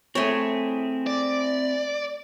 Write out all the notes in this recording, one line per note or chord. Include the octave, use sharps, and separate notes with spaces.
A3 C4 E4 G#4 C#5
D5